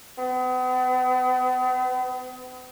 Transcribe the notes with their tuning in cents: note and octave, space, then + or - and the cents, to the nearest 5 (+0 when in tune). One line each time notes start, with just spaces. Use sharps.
B3 +45